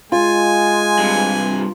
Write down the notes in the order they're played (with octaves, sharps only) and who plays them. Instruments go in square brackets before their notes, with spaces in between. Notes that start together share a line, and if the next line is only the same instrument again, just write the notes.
[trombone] G#3 [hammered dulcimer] F4 [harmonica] G#5
[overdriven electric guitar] G2 C3